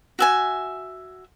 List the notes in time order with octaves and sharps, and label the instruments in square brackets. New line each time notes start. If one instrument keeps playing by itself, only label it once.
[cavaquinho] F#4 E5 G#5